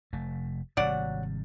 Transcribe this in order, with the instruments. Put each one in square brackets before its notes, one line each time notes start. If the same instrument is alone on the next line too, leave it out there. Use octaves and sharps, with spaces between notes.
[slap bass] F1 A3
[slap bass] G#1 C3 G3 [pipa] F#3 D5 F#5